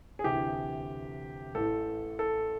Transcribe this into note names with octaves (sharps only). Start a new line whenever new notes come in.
G#4
D2 C3 E3 G4
A1 A2 E3 A4
A4